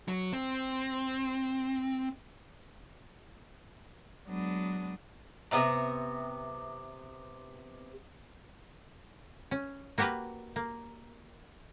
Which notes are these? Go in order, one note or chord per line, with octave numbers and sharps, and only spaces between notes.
F#3
C4
F#3 G#3 B3 D4 D#6
C3 B3 E5 A#5
C#4
A#3 F#4 G4 A#4 B4
A#3